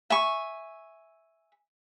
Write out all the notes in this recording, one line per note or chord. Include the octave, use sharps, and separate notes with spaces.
E5 G#5 C#6